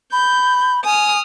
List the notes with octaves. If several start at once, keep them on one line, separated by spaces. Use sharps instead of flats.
B5 G6
G#5 D#6 F6